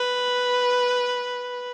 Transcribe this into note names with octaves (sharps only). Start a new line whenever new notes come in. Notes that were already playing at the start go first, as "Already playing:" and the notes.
Already playing: B4